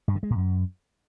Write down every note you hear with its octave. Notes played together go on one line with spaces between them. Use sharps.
G2
D3
G#3
A#2
F#2